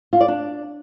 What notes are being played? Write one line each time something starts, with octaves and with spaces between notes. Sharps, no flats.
F4
D5
D4